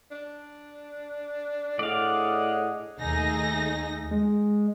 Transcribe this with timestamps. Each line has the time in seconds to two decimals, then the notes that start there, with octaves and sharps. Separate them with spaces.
0.11 D4
1.79 A2 D4 G#4 D5 D#5 F5 F#5
2.97 D#2 A3 D#4 G#4 A#6
4.11 G#3